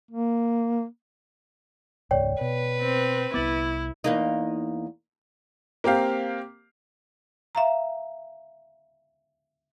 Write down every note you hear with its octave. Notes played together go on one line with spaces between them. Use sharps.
A#3
E1 C#2 G#2 C#5 D5 G5
B2 B4
C4
C2 B3 E4 D6 A6 F#7
E2 A#3 D#4
A#3 C4 G4 F5
E5 F5 A#5